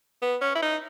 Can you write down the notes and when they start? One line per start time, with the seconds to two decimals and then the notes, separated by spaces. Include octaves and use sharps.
0.22 B3
0.41 C#4
0.55 E4
0.62 D#4